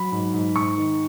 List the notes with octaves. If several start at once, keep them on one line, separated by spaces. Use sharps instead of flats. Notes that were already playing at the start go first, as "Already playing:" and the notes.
Already playing: F#3 B5
G#2
G#2
G#2 C#6
D#3